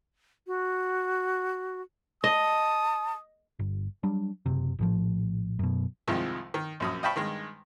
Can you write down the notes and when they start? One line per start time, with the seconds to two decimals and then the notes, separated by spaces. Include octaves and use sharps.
0.47 F#4
2.24 D#5 A5 D#6
3.59 G1
4.03 F#3 G3 D4
4.46 F#1 C3
4.79 A#1 A2 F3
5.59 F#2 B2
6.08 C2 F2 D#3 F3 G#3
6.54 D#3
6.80 A#1 F#2 D#6
7.03 D#5 F5 G5 A5 B5 C#6
7.16 G2 D#3 G#3